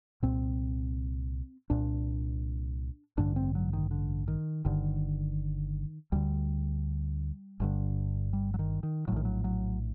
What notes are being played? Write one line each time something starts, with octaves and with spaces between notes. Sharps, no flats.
C2 A#2 C4
C2 A#2 D4
A1 G2 D3 D4
C4
F#3
D#3
D3
D#3
G1 G2 D3 D#3
D2 D3 G3
G1 G2 D3
G3
F#3
D#3
D#3
A#1 A2 D#3 F#3
F#3
F#3